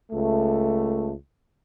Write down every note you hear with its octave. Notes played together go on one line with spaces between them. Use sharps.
C#2 A3